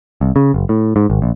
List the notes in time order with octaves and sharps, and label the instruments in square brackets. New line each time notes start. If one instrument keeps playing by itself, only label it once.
[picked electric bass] C2
C#3
F#1
A2
G#2
G#1
A#1